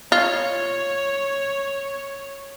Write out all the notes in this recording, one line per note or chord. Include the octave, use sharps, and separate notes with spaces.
F4 C#5